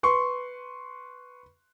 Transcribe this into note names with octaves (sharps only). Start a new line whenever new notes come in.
B4 C6 C#6